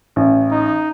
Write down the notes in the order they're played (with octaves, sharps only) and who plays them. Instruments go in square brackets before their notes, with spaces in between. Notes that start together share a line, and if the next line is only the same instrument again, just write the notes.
[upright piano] A1
[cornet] D#4